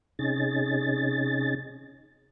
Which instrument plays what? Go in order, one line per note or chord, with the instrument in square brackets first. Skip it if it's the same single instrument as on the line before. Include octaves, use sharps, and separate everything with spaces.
[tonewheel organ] C3 C#4 D#4 G#4 A6